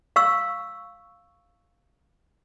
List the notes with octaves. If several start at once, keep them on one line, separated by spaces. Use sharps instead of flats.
F5 C#6 E6